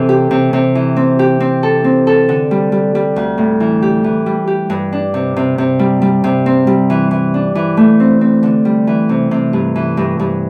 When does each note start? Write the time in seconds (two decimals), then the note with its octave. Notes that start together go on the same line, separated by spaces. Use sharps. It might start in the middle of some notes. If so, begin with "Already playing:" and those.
Already playing: C3 E3 E4 A4
0.09 G4
0.31 C3
0.53 C3
0.75 E3
0.96 C4
1.19 G4
1.40 C4
1.63 A4
1.84 C4
2.07 A4
2.29 D3
2.51 G3
2.72 G3
2.95 G3
3.16 D2
3.38 A2
3.60 E3
3.82 G4
4.04 E3
4.26 G3
4.47 G4
4.70 G2
4.92 D4
5.14 C3
5.36 C3
5.58 C3
5.79 G3
6.02 G3
6.24 C3
6.46 C4
6.67 G3
6.90 E3
7.11 E3
7.34 D4
7.55 E3
7.77 A3
8.00 C4
8.21 C4
8.43 D3
8.65 G3
8.87 E3
9.09 C3
9.31 C3
9.53 G2
9.76 E3
9.97 G2
10.19 G2